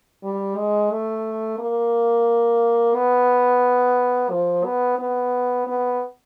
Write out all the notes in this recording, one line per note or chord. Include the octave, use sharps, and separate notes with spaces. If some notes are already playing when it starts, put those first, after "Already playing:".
G3
G#3
A3
A#3
B3
F3
B3
B3
B3